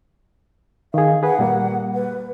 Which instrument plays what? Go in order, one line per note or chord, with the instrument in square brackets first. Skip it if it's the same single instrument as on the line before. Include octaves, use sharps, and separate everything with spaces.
[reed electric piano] D#3 G#4 [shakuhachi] F5
[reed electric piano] G#4 B4 [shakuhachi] F#5
[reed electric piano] A#2 G3 A#3
[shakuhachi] B4